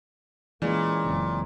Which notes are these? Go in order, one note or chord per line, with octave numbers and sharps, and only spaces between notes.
A#2 E3 G#3 A#3 C#4
F#1 C4